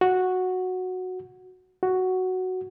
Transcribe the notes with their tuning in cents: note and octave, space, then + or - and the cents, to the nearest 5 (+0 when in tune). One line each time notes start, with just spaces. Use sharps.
F#4 -5
F#4 +5